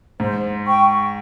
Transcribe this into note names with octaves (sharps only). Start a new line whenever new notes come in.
G#2 C5
G5 C#6